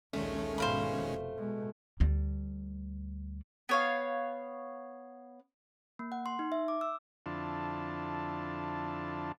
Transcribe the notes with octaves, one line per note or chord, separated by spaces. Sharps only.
A#1 D#2 D#3 G#3 A3 C#4
G#2 B2 C5 F5 B5
F1
B2 G#3
D2 G3
B3 C#5 F5
A#3
F#5
C6
D#4
E5
D6
E6
F2 D3 D4 E4 F4 A5